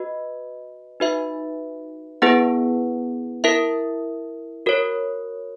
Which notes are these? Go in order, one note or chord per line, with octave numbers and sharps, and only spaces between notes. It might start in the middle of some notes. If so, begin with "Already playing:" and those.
Already playing: F#4 B4 D#5
D#4 F#4 B4 E5
B3 E4 G#4 B4 F#5
E4 A#4 E5
F#4 A#4 C#5